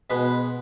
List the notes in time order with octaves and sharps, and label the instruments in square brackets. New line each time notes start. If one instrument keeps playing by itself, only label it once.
[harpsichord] B2 G#3 B3 B4